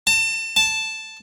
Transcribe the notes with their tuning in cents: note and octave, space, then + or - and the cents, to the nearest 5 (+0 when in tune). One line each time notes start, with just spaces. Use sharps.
A5 +30
A5 +0